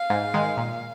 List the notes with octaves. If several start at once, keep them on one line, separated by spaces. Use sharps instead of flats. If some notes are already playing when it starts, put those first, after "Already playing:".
Already playing: F5
G#2
D#3 G#3
A#2